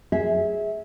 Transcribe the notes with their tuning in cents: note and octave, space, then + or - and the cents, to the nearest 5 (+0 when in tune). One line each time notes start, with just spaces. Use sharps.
G#4 +0 E5 -20